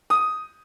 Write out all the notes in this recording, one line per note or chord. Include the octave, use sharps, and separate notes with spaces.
D#6